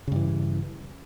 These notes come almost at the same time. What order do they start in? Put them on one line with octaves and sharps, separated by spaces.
C#3 G2 E3